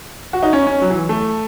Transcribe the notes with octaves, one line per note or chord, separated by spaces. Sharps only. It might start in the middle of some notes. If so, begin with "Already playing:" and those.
F#4
D#4
C#4
C#4
F#3
E3
A3